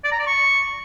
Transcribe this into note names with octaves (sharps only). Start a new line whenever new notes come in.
D5
A#5
D5
C#6